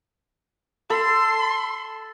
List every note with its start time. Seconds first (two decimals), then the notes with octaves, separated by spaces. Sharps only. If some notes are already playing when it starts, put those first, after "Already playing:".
0.90 A4 C6